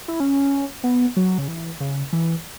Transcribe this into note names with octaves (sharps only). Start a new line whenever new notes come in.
E4
C#4
B3
F#3
C#3
E3
C#3
E3